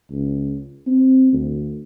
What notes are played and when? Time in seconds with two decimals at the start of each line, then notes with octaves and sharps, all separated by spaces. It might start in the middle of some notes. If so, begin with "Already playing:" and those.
0.11 C#2
0.87 C4
1.33 D2